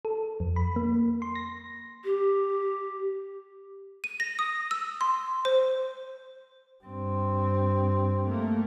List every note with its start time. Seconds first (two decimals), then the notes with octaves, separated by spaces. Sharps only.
0.05 A4
0.40 F2
0.56 B5
0.76 A#3
1.22 C6
1.35 A#6
2.05 G4
4.04 D#7
4.20 A#6
4.39 D#6
4.71 E6
5.01 C6
5.45 C5
6.84 G2 C4
8.27 A3 A#3